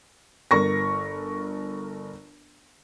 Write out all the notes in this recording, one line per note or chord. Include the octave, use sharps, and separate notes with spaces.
G1 A#4 C#6 A#6